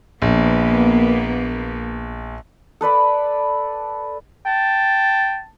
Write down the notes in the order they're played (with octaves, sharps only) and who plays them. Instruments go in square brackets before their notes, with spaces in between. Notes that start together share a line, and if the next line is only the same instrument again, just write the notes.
[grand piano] A#1 [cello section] A#3 B3
[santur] A4 B4 D5 B5
[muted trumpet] G5 [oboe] A5